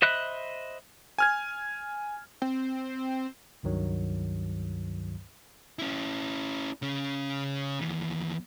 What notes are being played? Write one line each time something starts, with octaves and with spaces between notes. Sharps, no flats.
C5 D#5 E5 B5 F#6
G#5 F6 G#6
C4
C#2 G2 D#3 F#3
C#4 E4
C#3 C#4
D#2 E3